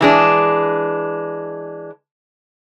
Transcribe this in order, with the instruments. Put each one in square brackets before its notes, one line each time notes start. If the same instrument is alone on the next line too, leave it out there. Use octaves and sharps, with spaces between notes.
[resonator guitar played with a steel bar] E3 G#3 D4